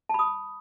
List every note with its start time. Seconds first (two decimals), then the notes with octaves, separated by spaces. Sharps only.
0.09 A5
0.14 B5
0.19 D#6